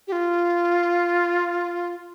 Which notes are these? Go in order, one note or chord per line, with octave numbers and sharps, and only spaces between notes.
G4
F4